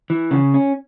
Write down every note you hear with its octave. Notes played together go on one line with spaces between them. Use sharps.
E3
C#3
C#4